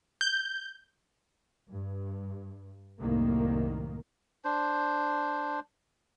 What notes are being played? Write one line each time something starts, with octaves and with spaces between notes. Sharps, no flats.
G6
G2
C2 F#2 A2 D#3 A#3
D4 C5